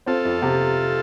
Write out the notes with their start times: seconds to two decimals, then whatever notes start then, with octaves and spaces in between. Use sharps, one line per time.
0.06 C4 F4 A4
0.25 F2
0.42 C3